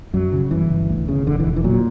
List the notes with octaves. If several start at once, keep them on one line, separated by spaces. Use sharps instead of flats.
F#2 F#3
C#3
G1 E3
G1
D2
C#3
E1 D3
E3
E1
E3
A#2 F#3